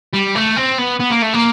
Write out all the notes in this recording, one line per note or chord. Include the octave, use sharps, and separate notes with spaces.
G3
A3
C4
B3
B3
A#3
A3
A#3